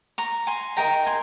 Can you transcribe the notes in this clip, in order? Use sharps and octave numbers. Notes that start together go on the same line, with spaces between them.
A#5 C#6
G#5 C6
D#4 A#4 D#5 G5 A#5
G#5 C6